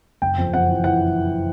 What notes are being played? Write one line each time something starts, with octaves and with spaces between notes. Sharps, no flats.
F#1 G5
F2
F2 F#5
E3
E3 F#5